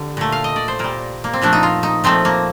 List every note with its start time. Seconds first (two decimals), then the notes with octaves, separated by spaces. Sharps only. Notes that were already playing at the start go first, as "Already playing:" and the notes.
Already playing: D3 G3
0.17 A#2 A3
0.32 F5
0.44 D#5
0.56 D5
0.68 C5
0.79 A#2 G3 A#4
1.24 A#3
1.33 C4
1.42 A#2 F3 A3 D4
1.53 D#4
1.63 F4
1.83 D#4
2.04 A#2 F3 A3 C4
2.25 A#3